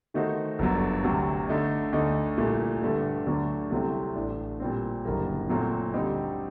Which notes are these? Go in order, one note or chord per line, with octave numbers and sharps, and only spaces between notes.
D#3 A3 D#4 F#4 C5
G1 F#2 D3 F#3
D2 C3 F#3
D3 A3 D#4
D2 D3 A3 D#4
C2 A#2 A3
G2 D3 A3
D2 D3 F#3 A3 D4
C2 C3 F#3 A3 C4
A1 A2 A3 D4
A#2 G3 C4
F#1 F#2 D3 G3 A#3
A#2 F#3 A3 C4
D2 D3 G3 C4 D#4